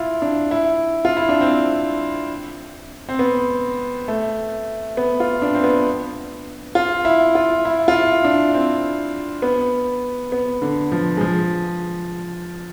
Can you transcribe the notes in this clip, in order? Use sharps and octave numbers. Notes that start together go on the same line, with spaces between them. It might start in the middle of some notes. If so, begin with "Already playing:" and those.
Already playing: E4 F4
D4
E4
F4
E4
D4
C4
C4
B3
A3
B3
F4
D4
C4
B3
F4
E4
F4
E4
F4
E4
D4
C4
B3
B3
D3
F3
G#3
F3